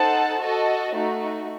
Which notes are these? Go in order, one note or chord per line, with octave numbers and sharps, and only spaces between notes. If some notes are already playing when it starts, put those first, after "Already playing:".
Already playing: D#4 A4 C5 F#5 A5
F#4 A4 D#5 A5
A3 D#4 F#4